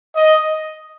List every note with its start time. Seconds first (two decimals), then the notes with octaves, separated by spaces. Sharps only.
0.16 D#5